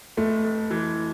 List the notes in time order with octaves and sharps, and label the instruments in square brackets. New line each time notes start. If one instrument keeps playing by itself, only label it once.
[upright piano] F1 [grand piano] A3
[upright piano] F1
E3